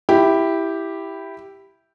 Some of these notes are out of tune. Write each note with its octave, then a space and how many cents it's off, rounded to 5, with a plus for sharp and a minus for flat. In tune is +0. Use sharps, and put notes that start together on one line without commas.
E4 +0 G4 +0